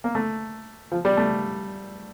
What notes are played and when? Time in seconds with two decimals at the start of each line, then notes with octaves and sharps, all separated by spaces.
0.04 A#3
0.15 A3
0.92 F3
1.05 G3
1.17 A3